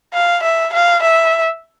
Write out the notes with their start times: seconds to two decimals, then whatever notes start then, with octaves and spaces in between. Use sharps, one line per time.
0.13 F5
0.43 E5
0.73 F5
1.02 E5